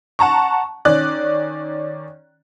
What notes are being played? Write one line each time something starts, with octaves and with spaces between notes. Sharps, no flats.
F#5 A5 A#5 C#6
D#3 C#4 D5 F#6